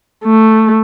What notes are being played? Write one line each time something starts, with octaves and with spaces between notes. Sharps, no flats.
A3